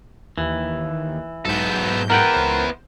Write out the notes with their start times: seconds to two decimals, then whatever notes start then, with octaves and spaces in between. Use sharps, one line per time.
0.38 D#2 E3
1.45 B1 G#2 B3 A4 G6
2.10 B3 E4 A#4 F#5 G5
2.33 C#2 C5